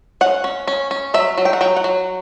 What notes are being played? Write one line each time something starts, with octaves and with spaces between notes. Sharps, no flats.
C#4 F#5
C#4
C#4
C#4
F#3 E5
F#3
G5
F#5
F#3 G5
F#5
F#3